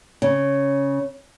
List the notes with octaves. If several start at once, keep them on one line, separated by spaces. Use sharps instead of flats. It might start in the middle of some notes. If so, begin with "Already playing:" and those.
C#3